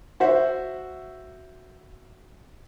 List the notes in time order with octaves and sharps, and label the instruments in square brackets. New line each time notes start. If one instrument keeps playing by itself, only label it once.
[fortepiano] F#4 C5 E5